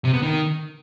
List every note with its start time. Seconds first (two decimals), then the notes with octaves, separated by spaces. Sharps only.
0.05 C3
0.14 B3
0.22 D#3